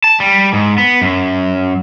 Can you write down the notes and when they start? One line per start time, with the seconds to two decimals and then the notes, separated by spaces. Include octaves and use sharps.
0.04 A5
0.20 G3
0.53 G#2
0.78 B3
1.01 F#2